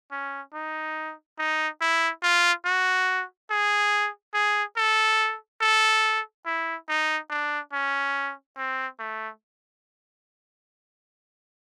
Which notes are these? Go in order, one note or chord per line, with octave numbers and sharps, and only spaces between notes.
C#4
D#4
D#4
E4
F4
F#4
G#4
G#4
A4
A4
E4
D#4
D4
C#4
C4
A3